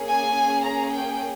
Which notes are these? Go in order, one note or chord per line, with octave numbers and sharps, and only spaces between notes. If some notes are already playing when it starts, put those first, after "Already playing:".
Already playing: A#3 C#4 G#4
G#5
A#5
G5